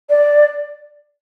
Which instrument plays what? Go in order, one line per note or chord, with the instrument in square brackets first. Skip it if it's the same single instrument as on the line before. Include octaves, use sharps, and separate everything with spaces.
[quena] D5